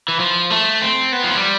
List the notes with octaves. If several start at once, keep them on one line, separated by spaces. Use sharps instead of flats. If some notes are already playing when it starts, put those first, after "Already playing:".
E3
F3
A3
C4
B3
F3
G3